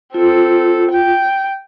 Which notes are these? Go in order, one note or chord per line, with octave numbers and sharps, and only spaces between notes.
C4 F4 A4
G5